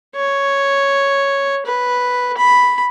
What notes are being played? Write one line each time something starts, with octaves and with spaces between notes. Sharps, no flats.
C#5
B4
B5